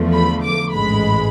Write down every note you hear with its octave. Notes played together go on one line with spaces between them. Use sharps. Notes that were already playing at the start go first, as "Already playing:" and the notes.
Already playing: E2 D3 F3 A3
B5
D6
A1 G#2 G#3 B5